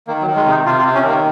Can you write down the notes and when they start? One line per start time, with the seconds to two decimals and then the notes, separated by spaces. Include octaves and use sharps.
0.08 D#3 A#3
0.21 F#3
0.27 D#3
0.36 G#3
0.46 C3 D#4
0.65 C3 F4
0.79 F4
0.85 C3
0.94 C#4
1.04 D#3 A#3